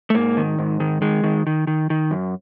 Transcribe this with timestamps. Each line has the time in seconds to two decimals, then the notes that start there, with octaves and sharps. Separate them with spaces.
0.10 A3
0.15 G#2 A#3
0.37 D#3
0.59 G#2
0.80 D#3
1.02 D#3 G#3
1.23 D#3
1.47 D#3
1.67 D#3
1.90 D#3
2.11 F#2